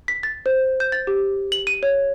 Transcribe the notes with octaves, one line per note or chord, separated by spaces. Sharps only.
B6
A6
C5
G6
A6
G4
F#7
D#7
C#5